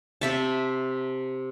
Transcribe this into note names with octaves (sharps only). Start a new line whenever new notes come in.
C3 E5 A5